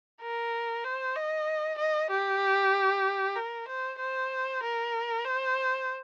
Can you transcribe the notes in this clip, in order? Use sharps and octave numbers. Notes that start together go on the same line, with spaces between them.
A#4
C5
D#5
D#5
G4
A#4
C5
C5
A#4
C5